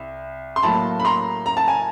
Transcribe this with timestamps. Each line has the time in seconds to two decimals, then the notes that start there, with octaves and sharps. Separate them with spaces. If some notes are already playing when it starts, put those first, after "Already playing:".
Already playing: C2
0.56 C6
0.63 A2 F#3 A#3 A5 B5
1.00 B5
1.05 A#5 C6
1.46 A#5
1.57 A5
1.68 G#5